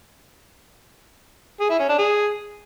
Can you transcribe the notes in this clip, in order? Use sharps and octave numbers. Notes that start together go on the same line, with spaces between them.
G#4
E4
C#4
D4
G#4